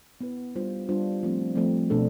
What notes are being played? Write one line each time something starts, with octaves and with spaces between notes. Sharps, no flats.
B3 E4 B4
G3 D4 F4 C5
G3 D4 F4 C5
F3 A3 C4
F3 A3 C4
B2 A3 D4 A4